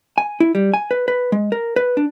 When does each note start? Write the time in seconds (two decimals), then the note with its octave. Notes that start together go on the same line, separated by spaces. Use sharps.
0.18 G#5
0.40 E4
0.55 G3
0.74 G#5
0.91 B4
1.08 B4
1.32 G#3
1.52 A#4
1.76 B4
1.97 D4